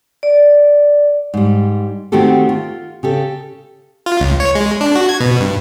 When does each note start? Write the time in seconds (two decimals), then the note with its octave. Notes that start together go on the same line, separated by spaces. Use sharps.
0.23 D5
1.34 G#2 G3
2.12 D#3 A3 C4 F#4 G4 A4
2.49 F4
3.03 C#3 G4 A4
4.06 F4
4.20 C#2
4.40 C#5
4.55 G#3
4.81 D4
4.96 F#4
5.09 G#6
5.20 B2
5.40 G2